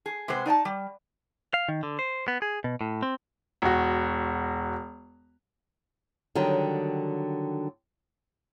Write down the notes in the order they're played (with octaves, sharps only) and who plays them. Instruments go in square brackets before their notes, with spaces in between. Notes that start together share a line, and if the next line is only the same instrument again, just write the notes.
[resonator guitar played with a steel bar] G#4
C3 G#3 B3 C5
D#4 D5 G5 A5
G3
[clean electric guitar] F5
D#3
D3
C5
B3
G#4
B2
A2
C4
[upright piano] E1 F#4
[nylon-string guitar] D3 D#3 F#3 G3 D#5 G5